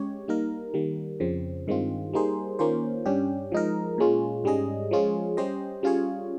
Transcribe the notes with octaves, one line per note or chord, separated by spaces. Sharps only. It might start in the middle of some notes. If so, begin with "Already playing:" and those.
Already playing: G#3 C#4 G4 C#5
G3 A#3 D#4 A#4
D#3 G3 A#3
F2 C#3 F3 C4
G2 D#3 G#3 C4 F4
G3 A#3 D#4 G#4 C5
D#3 A#3 C#4 F4 C5
G2 G3 C#4 G4
F3 G#3 D#4 A#4
A#2 G#3 C#4 F4
G#2 G3 C#4 G#4 D#5
F3 G#3 C#4 F4 G#4
G3 C#4 G4 C5 D#5
G3 C#4 F4 G#4 C#5